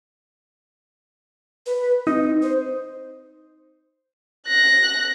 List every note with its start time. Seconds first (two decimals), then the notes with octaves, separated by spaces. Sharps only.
1.66 B4
2.07 C4 D#4
2.42 C5
4.47 F#6 A#6